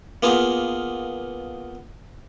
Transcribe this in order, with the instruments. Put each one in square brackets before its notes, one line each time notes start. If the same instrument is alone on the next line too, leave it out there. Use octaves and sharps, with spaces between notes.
[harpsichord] A#3 B3 F4 G#4